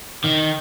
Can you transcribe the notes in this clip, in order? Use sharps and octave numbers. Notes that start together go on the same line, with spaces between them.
D#3